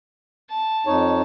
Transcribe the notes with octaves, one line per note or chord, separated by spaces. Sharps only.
A5
F2 D#4 C#5